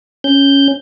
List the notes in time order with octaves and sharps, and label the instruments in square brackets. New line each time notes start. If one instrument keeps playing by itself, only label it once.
[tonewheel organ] C#4 G6